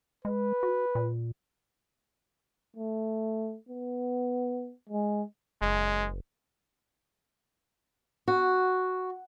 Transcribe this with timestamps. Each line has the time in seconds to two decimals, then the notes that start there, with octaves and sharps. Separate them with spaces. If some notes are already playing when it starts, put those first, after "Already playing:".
0.25 G#3 B4
0.63 F#4
0.95 A#2
2.76 A3
3.69 B3
4.90 G#3
5.62 F#1 G#3
8.28 F#4